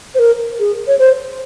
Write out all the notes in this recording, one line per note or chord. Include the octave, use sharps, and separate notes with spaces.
C5
A#4
G#4
C#5
C5